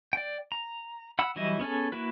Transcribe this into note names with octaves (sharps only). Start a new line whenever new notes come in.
D5 G5
A#5
F#5 B5 E6
E3 F#3 G3 E4 D#5
B3 C#4 G#4 A4
A#3 E4 F#4 B4